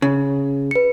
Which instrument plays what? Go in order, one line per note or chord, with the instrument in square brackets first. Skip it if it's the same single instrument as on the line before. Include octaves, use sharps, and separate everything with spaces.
[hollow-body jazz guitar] C#3
[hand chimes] B4 C#7